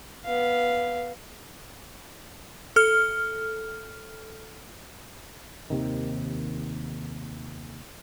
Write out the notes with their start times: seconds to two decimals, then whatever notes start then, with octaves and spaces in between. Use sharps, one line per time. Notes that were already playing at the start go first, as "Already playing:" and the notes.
0.25 B3 F5
2.76 A4 F6
5.70 D#2 C3 D#3